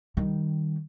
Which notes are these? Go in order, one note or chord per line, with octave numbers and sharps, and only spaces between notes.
D#3 G3